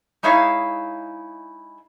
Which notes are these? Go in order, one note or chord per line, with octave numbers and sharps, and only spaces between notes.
G#3 D#4 E4 C#5 F5